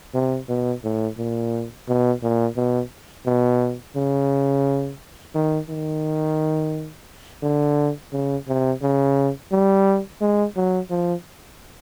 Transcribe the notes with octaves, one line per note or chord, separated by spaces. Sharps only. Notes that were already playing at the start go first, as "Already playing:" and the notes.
C3
B2
A2
A#2
B2
A#2
B2
B2
C#3
D#3
D#3
D3
C#3
C3
C#3
G3
G#3
F#3
F3